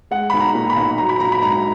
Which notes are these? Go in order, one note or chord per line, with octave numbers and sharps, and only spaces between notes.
G#3 F#5
B1 B5
A#5
A#2
B5
B1
F#3 A#5
B5
A#1 A#5
B5
G#2 A#5